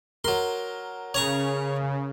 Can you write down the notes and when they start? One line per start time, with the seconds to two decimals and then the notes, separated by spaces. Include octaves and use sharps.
0.24 F#3 A#4 C6
1.14 C#3 C#5 A#5 C#6